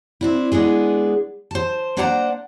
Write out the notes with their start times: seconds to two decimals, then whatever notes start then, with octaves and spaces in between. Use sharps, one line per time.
0.21 C4 D4 E4
0.52 G#3 B3 D4 G#4
1.51 C5 A5
1.97 A#3 D4 C5 D5 F#5 A#5